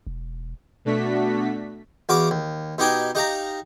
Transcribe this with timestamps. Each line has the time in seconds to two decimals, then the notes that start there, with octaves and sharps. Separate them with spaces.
0.07 E1
0.85 B2 A3 D4 F#4 B6
2.09 E2 F#4 F5 B5 D6
2.31 D#2
2.78 B2 D#4 G4 G5 G#5
3.15 D#4 G4 F5 A#5